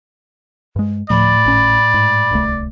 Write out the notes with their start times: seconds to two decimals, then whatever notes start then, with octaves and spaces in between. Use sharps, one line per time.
0.76 G2 G#3
1.10 D2 A2 F3 D5 B5
1.45 G#1 C#4
1.94 G#2
2.31 D1 C2 A3